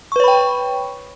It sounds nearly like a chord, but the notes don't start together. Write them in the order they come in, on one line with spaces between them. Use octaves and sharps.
C#6 B4 C#5 B5 G5